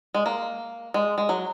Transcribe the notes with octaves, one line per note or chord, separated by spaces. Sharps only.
G#3
A#3
G#3
G#3
F#3